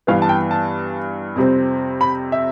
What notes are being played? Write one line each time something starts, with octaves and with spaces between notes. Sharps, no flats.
G2 E3 B3 F5
A5
G5
A5
F2 C3 G3 C4
B5
E5